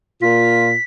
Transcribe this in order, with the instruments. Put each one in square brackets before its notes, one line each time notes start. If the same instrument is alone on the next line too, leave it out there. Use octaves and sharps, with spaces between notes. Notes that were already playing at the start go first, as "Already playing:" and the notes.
[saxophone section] A#2 F4 [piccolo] B6